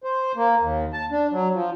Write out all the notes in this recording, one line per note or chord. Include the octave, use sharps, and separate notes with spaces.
C5
A#3
D#2
A5
D4
F#3
F3